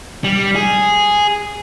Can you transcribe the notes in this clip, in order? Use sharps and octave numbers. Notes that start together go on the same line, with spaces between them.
G3
G#4